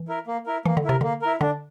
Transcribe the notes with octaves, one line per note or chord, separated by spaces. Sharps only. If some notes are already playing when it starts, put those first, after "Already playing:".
Already playing: E3
E4 A#4
A#3
E4 A#4
E3 A#3
D3
C3 E4 A#4
D3 A#3
E4 A#4
D3 D4